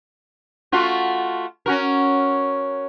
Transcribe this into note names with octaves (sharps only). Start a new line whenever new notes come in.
A3 F4 F#4
C#4 F#4 A#4